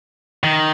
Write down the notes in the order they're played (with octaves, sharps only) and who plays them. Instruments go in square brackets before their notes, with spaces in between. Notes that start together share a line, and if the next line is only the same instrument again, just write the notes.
[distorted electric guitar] D#3